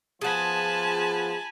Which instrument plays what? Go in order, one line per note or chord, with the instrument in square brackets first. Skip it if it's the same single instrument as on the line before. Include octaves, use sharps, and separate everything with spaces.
[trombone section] F3 B3 F4 [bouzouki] G#4 F#5 [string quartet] G#5 A5 B5